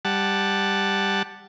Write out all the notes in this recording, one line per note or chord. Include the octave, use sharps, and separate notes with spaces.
G3 F#5 A5